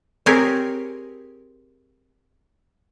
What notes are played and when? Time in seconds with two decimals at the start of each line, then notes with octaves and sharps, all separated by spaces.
0.26 C4 G4 G#4 A#4 C#5 G#5